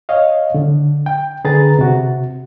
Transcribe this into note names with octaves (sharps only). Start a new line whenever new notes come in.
C#5 D#5 F5
D3
G5
D3 G#4 B4 A#5 A6
C3 F#4